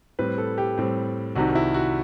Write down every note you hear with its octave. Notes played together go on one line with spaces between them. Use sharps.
A2 G3 C4 B4
A4
G4
A2 G3 C4
C2 C3 D#3 F#4
E4
F#4